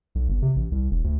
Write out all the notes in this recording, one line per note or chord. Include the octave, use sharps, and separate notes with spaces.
B1
G1
C3
A1
C2
E1
D2